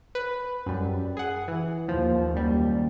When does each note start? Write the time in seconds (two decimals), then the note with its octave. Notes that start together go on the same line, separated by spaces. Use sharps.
0.15 B4
0.66 F#2 G3
1.17 G#4 F#5
1.48 E3
1.88 D#2 F3
2.34 F#2 G3